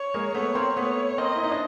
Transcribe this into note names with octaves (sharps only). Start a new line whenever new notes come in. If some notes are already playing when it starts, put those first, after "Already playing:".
Already playing: C#5
G#3 A#3
A3 B3 C#5
A#3 C4
A3 B3 C#5
A#3 C4 D#5
E4
D#4
D4